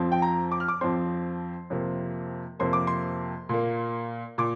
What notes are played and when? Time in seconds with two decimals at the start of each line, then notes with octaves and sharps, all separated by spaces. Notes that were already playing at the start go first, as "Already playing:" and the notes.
Already playing: F2 F3 C4
0.12 G5
0.22 A#5
0.52 D6
0.60 F6
0.68 D6
0.81 F2 F3 C4 C6
1.70 F2 C3 A#3
2.59 F2 C3 A#3 C6
2.73 D6
2.87 C6
3.49 A#2 A#3
4.38 A#2 D6